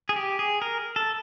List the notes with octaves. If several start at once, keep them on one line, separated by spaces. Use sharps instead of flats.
G#4
G4
G#4
A#4
A4